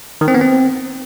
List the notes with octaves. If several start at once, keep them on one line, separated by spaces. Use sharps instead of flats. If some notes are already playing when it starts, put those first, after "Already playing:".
D#3
C4
B3
C4